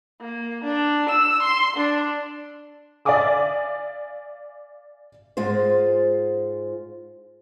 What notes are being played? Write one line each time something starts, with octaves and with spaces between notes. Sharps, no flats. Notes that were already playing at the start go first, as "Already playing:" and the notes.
A#3
D4
E6
C6
D4
D5 E5 F5 G#5 D6 D#6
G#2 G#3 F4 C5